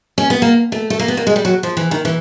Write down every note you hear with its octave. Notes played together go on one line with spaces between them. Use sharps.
C#4
B3
A#3
A3
A3
A#3
B3
A#3
G#3
G3
F#3
F3
E3
D#3
E3